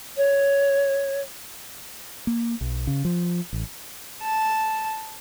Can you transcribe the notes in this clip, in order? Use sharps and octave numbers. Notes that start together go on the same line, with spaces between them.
C#5
A#3
B1
C#3
F3
A1
A5